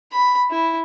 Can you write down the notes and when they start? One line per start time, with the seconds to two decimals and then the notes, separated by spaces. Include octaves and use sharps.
0.12 B5
0.51 E4